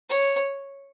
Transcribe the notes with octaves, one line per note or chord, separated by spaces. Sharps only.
C#5